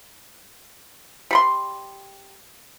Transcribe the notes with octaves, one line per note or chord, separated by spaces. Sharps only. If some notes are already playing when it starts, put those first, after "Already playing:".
G3 B5 C6